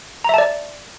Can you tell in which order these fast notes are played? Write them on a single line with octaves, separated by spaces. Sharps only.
A#5 E5 A5 D5